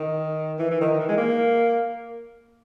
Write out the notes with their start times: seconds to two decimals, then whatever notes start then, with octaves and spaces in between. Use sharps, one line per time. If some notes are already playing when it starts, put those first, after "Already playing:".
Already playing: D#3
0.59 E3
0.71 E3
0.81 D#3
0.93 D#3
1.00 E3
1.09 G#3
1.17 A#3